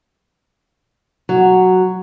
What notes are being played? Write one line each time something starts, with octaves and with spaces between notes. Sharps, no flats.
F#3